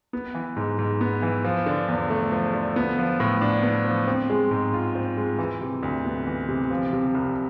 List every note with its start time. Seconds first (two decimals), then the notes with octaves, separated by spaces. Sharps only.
0.13 B3
0.35 E3
0.56 G#2
0.79 G#2
1.01 B3
1.22 E3
1.44 F3
1.66 D3
1.88 E2
2.10 A3
2.32 F3
2.54 D3
2.76 B3
2.98 F3
3.20 A2
3.41 D4
3.63 B3
3.85 F3
4.08 C4
4.30 G#3
4.51 G#2
4.73 F4
4.95 C4
5.17 G#3
5.39 E3
5.61 C3
5.83 D2
6.05 B3
6.27 E3
6.49 C3
6.70 F3
6.93 C3
7.14 C2